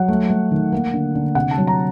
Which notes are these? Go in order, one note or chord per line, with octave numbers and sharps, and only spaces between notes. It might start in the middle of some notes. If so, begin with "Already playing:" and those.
Already playing: F#3 F#5
A3
A3
D#3
A#3
D3
D3
C3 F#5
A5
F#3
A#5